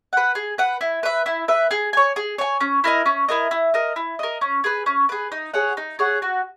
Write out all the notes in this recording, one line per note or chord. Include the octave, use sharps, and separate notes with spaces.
B4 F#5
G#4
B4 F#5
E4
B4 E5
E4
B4 E5
G#4
C#5 G#5
G#4
C#5 G#5
C#4
E4 A#4 D#5
C#4
E4 A#4 D#5
E4
A#4 D#5
E4
A#4 D#5
C#4
G#4 B4
C#4
G#4 B4
D#4
G#4 C#5 F#5
D#4
G#4 C#5 F#5
F#4